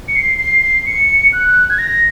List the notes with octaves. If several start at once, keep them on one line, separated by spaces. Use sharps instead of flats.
C#7
C7
C7
C7
C#7
F#6
G#6
A#6